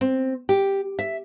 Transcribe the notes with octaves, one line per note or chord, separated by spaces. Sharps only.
C4
G4
E5